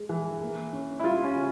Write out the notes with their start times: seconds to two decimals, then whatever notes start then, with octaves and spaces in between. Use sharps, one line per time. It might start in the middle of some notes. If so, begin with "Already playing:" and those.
Already playing: G#3
0.09 E3
0.41 A#3
0.73 C#4
1.00 E4
1.04 G3 F4
1.24 C#4
1.35 C#3